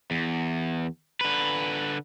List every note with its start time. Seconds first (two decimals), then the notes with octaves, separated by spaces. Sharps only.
0.11 E2
1.21 D3 B4